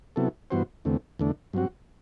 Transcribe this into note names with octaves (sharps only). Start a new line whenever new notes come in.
C3 F#3 B3 E4 A4
G2 E3 B3 F#4 C5
E2 D3 A3 C4
E2 D3 A3 D4
G2 F#3 C4 F#4